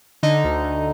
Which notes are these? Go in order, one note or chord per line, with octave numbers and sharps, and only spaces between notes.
D3 D#4
D2
D2